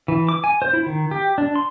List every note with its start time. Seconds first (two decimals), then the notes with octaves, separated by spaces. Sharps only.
0.08 E3
0.29 D6
0.44 G#5
0.62 C5
0.73 E4
0.86 D#3
1.11 G4
1.38 D4
1.56 C6